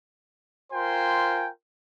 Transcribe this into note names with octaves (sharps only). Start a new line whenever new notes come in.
F4 A#4 C5 G5 G#5 C6